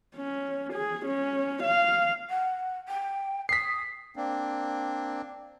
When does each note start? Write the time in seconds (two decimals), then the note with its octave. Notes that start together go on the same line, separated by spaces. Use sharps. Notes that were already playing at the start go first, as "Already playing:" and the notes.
0.16 C#4
0.73 G#4
1.06 C#4
1.63 F5
2.30 F#5
2.88 G5
3.49 D#6 B6 C7
4.16 A#3 C4 D4